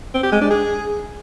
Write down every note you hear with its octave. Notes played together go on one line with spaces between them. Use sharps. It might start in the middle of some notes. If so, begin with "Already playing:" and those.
C4
G4
G#3
D4
G#4